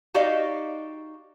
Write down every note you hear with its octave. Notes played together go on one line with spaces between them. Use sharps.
D#4 F#4 G4 D5 D#5 F5